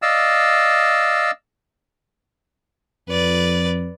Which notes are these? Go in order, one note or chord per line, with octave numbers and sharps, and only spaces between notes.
D5 D#5 F5 E6
F2 B4 D5